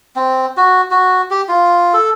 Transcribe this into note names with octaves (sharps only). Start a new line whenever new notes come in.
C4
F#4
F#4
G4
F4
A4